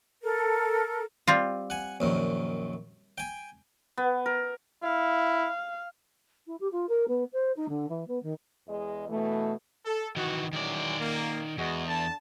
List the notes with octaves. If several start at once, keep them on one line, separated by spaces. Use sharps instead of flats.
A4 A#4
G3 C4 F4
F#5 G#5
A#1 F#2 D#3
G5 G#5
B3
A#4
E4 F5
E4
G4
F4
A#4
B3
C5
D#4
D3
E3
B3
D#3
E2 G#3 D#5
B2 E3 A3
A4
D#3 E3 F#4
D#3 E3 F#3 G#3 D5
A#3
E2 G#3 F#4 D#5
D3 A5